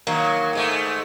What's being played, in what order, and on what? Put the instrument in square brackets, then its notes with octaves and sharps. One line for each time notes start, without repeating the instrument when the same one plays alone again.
[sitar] D#3 F#3 [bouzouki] A#3
[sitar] G#2 G#3 A3